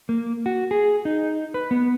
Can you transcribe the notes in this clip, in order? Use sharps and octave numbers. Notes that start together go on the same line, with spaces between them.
A#3
F#4
G#4
D#4
B4
B3